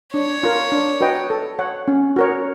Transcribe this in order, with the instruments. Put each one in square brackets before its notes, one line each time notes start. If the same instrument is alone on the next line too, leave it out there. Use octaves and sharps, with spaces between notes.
[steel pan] D4 [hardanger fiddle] C#5
[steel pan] F4 A#4
D4
F#4 B4 D#5 G5
A4
C#5 F#5
C#4
F#4 A#4 C#5